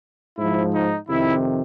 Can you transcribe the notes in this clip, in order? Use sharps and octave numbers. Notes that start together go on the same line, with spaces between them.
G#2 F3 E4
D#4
F2 C3 D#3 E4